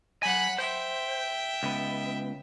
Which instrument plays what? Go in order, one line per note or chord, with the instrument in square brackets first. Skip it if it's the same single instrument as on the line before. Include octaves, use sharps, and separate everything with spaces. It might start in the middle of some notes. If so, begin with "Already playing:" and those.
[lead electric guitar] F#3 G#5 [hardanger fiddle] F#5 B5
[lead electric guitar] C5 [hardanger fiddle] E5 G5
[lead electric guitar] C#2 B3